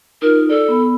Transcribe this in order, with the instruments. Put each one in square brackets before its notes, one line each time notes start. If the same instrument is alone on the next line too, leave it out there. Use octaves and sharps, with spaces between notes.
[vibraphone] D#4 F4 [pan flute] A#4
[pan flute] A4 [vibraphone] D5
[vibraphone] B3 B5